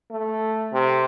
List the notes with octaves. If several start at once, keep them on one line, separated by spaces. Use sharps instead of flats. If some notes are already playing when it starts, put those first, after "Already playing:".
A3
C3